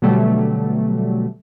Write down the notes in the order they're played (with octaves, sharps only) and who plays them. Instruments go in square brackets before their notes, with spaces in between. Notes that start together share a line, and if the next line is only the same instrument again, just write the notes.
[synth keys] B2 D3 F#3 G3 A3